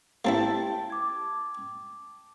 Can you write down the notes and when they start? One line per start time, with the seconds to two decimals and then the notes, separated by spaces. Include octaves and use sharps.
0.25 A#3 C4 E4 G4 B4 G5 A5
0.90 D6 G#6